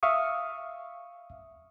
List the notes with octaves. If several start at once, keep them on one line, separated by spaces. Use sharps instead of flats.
E5 F5 C#6 D#6